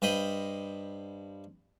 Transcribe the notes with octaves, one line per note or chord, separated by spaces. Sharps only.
G2 C5 D#5 B5